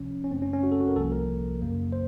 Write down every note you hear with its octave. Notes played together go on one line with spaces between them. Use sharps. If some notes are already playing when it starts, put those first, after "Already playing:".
Already playing: C#2 C3 F3 C#4
C#4
F#2 C#3 A3 C4
C#4
C#4
F#4
A4
F#4
A#4
C2 C3 F3 A#3 A4
A#4
F#2 C#3 F#3 A#3
C5